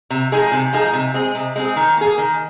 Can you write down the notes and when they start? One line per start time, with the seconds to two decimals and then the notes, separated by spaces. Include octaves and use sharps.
0.10 C3
0.32 F3 G#3 D#4 G#4
0.52 C3
0.73 F3 G#3 D#4 G#4
0.93 C3
1.14 G#3 C4 G#4
1.35 C3
1.56 G#3 C4 G#4
1.76 D#3
1.97 A#3 G#4
2.18 D#3